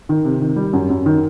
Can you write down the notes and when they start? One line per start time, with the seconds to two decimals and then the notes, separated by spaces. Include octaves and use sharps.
0.09 D#3
0.25 C3
0.41 D#3
0.56 G3
0.73 F#2
0.90 F#2
1.06 D#3